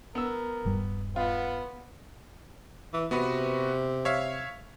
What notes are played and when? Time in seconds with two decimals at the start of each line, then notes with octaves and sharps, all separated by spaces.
0.15 B3 A#4 E6
0.65 D#1 G2 G3
1.16 B3 F4
2.94 E3
3.11 C3 B3 F#4 B4
4.05 C#5 E5 F5